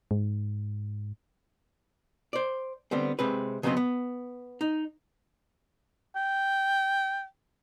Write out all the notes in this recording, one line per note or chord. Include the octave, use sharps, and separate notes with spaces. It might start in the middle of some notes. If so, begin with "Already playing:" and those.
G#2
C5 D5
D3 G3 B3 C4
C3 G#3 C4 B4
C#3 F#3 G#3 B3 C4 D#5
B3
D#4
G5